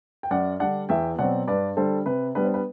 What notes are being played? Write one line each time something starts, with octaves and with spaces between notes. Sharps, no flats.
G5
F#2 D5 F#5
D3 G3 D4 D5 F#5
E2 E5 G5
B2 F#3 C4 D5 F#5
G2 B4 D5
D3 G3 A4 C5
C3 B4
G3 B3 D4 B4
C5
B4